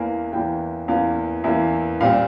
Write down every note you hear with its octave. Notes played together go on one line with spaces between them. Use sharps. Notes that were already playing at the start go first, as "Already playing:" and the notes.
Already playing: E2 E3 A#3 G#5
E2 E3 A#3 G5
E2 E3 A#3 F5
E2 E3 A#3 E5
A#2 G3 C4 F5